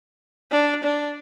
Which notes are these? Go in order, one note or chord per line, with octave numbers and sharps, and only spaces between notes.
D4
D4